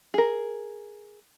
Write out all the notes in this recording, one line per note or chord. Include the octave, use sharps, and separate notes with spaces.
G#4 A#4